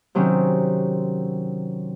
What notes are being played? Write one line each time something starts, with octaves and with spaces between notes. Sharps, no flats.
C3 D#3 F#3 C4 C#4